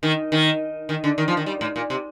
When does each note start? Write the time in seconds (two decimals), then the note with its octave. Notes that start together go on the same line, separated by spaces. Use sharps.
0.03 D#3
0.32 D#3
0.89 D#3
1.04 D3
1.18 D#3
1.28 F3
1.37 D#3
1.46 G3
1.61 A2
1.76 A#2
1.90 C3